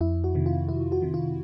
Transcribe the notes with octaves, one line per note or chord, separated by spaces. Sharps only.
F2 E4
F#4
C3 D#3
F4
F2 E4
F#4
C3 D#3
F4